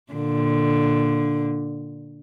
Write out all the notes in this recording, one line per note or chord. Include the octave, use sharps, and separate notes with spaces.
A#2 D3